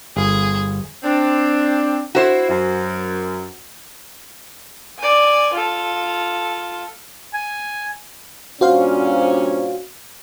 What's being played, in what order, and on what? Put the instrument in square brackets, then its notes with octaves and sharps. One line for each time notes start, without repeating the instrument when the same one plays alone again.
[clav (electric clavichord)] G1 [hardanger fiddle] G#4
[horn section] C4 D4
[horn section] E4 [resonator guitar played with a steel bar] F#4 C5
[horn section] F#2
[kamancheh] D5 G#5
F4 A4
[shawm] G#5
[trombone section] G2 A#2 C#4 [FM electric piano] F#4 C5 F5